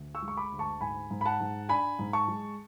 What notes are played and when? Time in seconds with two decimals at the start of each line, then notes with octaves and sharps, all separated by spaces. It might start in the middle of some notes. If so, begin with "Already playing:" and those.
Already playing: D2
0.15 C#6 E6
0.22 G#3
0.28 C#6
0.37 B5 D6
0.52 D2
0.59 A5 C#6
0.81 G#2 G#5 B5
1.11 G#2
1.21 B5
1.26 F#5 A5
1.41 G#2
1.69 D4 G#5 B5
1.99 G#2
2.13 A5 C#6
2.28 G#3